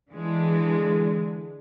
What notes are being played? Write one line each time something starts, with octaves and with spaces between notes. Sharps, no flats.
D3 E3 G#3